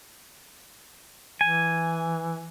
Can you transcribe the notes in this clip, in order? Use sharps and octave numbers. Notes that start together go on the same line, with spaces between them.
E3 G#5